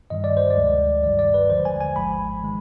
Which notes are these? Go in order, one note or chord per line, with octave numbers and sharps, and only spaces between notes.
G2 D#3 G3 D#5
D5
C5
D5
D2 C3 F3 G#3
G1 G2 D#3 G3 D5
D5
B4
D#2 D3 F3 G#3 C5
G#5
G#5
G#1 G#2 F3 G#3 B5
D#3 G#3